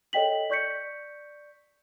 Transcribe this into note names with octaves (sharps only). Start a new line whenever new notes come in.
A4 C#5 D#5 G5 B6 F#7
D5 C#6 G6 B6 C#7